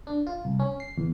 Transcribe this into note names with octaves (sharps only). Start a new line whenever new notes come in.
D4
F4
C2
C#4
C7
E2